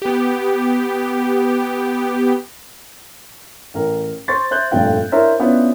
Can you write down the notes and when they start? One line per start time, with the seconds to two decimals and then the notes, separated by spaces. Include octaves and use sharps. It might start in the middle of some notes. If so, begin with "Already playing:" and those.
0.02 B3 G4
3.74 A1 A#4
4.28 C5 C6 C#6 A6
4.51 C5 E5 F#6 G6
4.71 F1 A#1 G2 A3 F4 G5
5.12 D4 E4 A#4 C5 C#5 E5
5.39 B3 C#4 D4 E4 F4 B4